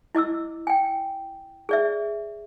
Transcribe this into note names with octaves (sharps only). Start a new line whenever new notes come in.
E4 D#5 D6 E6
G5 G#5
G#4 D5 E5